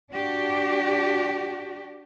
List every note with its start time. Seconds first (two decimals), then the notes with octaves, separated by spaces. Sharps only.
0.11 D4 F#4 G4